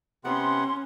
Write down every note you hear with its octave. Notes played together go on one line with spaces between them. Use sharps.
C3 B3 C#4 F#5 C6